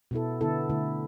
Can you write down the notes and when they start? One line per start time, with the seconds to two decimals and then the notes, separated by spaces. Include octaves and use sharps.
0.11 B2 B3 E4 A4
0.41 D3 B3 E4 A4
0.70 D3 A3 E4